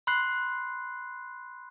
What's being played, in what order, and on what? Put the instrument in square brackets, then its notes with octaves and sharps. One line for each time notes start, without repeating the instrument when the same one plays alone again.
[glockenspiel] B5 C6 F#6 C7